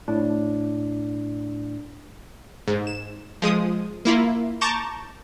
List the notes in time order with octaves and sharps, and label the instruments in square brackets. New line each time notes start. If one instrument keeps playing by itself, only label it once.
[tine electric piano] A2 D4
[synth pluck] G#2
E7
F3 G#3 D#6
A#3 E4 F4
A5 A#5 C#6 D6 G6 E7